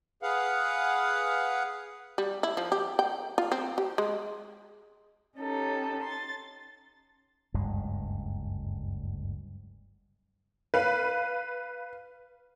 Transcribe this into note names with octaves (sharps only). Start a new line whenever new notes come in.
G#4 B4 F5 F#5
G3
E4
F3
G4
G5
F4
C4
G4
G#3
C#4 D#4 G4 A4
C6 A6
F#1 D2 G2 G#3
B4 F5